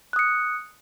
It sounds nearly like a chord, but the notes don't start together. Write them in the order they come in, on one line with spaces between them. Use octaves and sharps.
F#6 D#6 C#7